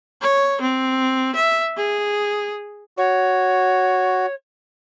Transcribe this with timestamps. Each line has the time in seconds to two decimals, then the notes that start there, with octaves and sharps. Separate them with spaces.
0.22 C#5
0.61 C4
1.35 E5
1.77 G#4
2.98 F#4 C#5